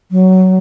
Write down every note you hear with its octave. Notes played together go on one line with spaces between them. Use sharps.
F#3